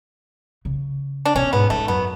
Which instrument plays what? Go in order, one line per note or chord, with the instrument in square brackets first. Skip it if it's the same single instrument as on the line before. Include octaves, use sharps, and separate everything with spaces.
[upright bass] C#3
[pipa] D4
[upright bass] B2 [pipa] C#4
[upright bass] G#2 [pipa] B3
[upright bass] G#2 [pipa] A3
[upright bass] F#2 [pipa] B3